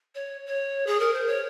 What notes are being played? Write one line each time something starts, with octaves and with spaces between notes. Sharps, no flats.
C#5
C#5
G#4
A#4
C5
C#5